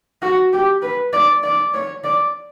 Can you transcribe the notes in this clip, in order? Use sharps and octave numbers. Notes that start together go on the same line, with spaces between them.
F#4
G4
B4
D5
D5
C#5
D5